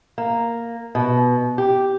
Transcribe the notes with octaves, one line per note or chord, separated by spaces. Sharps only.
A#3
B2
G4